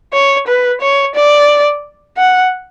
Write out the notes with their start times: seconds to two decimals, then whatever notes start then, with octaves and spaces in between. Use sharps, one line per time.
0.13 C#5
0.47 B4
0.81 C#5
1.15 D5
2.17 F#5